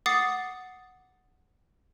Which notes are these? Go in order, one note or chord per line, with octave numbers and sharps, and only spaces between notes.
F#5 D6 D#6 A6 C7